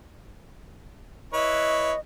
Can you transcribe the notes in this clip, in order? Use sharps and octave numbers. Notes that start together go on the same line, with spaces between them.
E4 B4 C#5 D#5